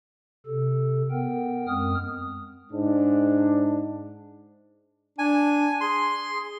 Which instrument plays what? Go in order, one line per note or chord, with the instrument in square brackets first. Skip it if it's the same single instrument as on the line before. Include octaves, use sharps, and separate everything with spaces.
[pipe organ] C3 A4
B3 A#4 G5
F#2 G#3 C4 D#6 F6
[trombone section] G#2 D4
[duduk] D4 [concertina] G#5
[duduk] G#4 [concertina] C6